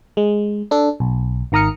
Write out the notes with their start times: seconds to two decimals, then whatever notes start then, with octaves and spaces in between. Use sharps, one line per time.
0.17 G#3
0.71 D4 A4
1.00 B1
1.52 G#1 D#3 A#5 D#6 F6 C#7